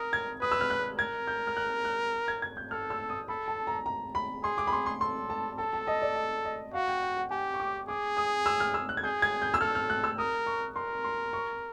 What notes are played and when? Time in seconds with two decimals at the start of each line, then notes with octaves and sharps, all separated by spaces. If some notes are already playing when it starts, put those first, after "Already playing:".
Already playing: A#4 D#6
0.13 G#6
0.41 B4 D#6
0.52 E6
0.61 F6
0.70 F#6
0.98 A#4 G#6
1.27 G6
1.47 F6
1.57 F#6
1.85 F#6
2.28 G#6
2.42 G#6
2.57 G6
2.71 A4 F6
2.90 E6
3.10 D#6
3.28 A4 B5
3.48 A5
3.67 A#5
3.86 A#5
4.15 B5
4.43 G#4 C6
4.58 D6
4.67 B5
4.73 C6
4.86 C6
5.01 A4 C6
5.30 A5
5.58 A4 A5
5.73 A5
5.87 D#5
6.02 D5
6.16 D#5
6.45 D#5
6.73 F#4 F5
6.88 G5
7.02 G5
7.16 F#5
7.31 G4 G#5
7.54 C#6
7.60 D6
7.88 G#4 D6
8.17 D#6
8.46 E6
8.60 F6
8.74 E6
8.89 F#6
8.97 G#6
9.04 G#4 G6
9.22 G#6
9.42 G6
9.54 E6
9.60 A4 F6
9.75 F6
9.90 F#6
10.04 E6
10.18 A#4 D#6
10.46 C#6
10.76 A#4 C6
11.04 C6
11.33 C#6